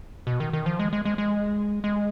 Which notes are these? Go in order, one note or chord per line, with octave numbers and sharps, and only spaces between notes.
B2
D#3
D#3
F3
G#3
G#3
G#3
G#3
G#3